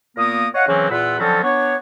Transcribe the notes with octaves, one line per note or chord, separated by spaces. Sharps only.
A#2 A#3 B3 A#4 D#6
C#5 D#5 F5 F#5
C#3 E3 F#3 A#3 C4 C#4
E2 A#2 F4 F#5 B5 E6
D3 F3 F#3 C4 C#4 A4
B3 D4 C#5